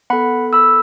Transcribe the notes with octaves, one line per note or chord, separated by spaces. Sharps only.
B3 A4 F#5 B5
B5 E6